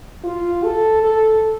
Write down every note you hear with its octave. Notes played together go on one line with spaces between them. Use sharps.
F4
A4
A4